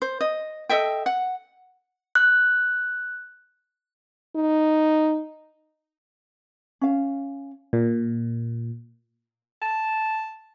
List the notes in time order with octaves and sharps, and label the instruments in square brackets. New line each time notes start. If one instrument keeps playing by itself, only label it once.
[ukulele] C5
D#5
A4 D#5 E5 G5
F#5
[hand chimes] F#6
[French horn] D#4
[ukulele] C#4 F5
[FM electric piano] A#2
[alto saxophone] A5